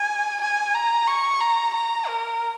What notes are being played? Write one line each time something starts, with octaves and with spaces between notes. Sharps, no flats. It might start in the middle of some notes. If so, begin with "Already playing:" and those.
Already playing: G#5
G#5
A#5
C#6
A#5
A#5
A#4